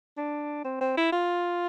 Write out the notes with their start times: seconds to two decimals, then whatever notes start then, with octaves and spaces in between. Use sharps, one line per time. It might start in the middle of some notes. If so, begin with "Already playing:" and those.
0.18 D4
0.65 C4
0.81 C4
0.97 E4
1.12 F4